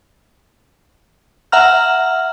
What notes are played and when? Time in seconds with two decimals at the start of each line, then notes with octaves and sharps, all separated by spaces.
1.52 E5 F#5 A#5 F6